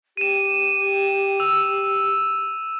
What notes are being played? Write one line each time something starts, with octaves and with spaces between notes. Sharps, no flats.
G4 D#7 E7
E6 F7